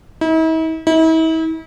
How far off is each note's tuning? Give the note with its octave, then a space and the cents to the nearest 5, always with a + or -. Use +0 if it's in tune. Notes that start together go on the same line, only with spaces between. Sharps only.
E4 -45
E4 -40